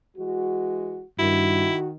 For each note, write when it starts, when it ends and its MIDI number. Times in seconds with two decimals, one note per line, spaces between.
0.16 1.03 52
0.16 1.03 56
0.16 1.03 66
1.19 1.67 43
1.19 1.96 51
1.19 1.76 64
1.19 1.88 66